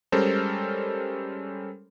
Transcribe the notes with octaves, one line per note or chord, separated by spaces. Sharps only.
G3 G#3 C#4 A4 A#4 C5